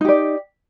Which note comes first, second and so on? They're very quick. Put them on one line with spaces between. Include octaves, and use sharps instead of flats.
D#4 G4 D5